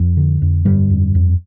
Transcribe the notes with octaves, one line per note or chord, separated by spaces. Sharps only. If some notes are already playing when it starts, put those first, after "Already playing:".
Already playing: F2 F3
D3
F2
G2 D3 G3
F2
F2